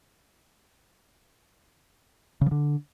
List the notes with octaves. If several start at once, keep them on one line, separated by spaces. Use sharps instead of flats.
C#3
F3
D3